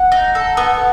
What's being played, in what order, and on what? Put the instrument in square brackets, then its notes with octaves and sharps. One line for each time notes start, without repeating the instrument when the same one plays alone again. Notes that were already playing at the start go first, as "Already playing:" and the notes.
Already playing: [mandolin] F#5
D#4
A4
B3